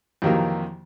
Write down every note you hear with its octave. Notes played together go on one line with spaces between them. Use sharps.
F2 C3 D#3 E3 F#3 A#3